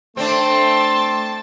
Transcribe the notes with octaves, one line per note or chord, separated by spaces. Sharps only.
A3 C4 D4 G5 A5 C6